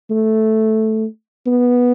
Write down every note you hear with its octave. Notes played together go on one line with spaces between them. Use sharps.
A3
B3